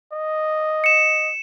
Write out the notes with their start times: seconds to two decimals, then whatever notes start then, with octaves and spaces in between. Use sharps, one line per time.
0.13 D#5
0.84 C#7 E7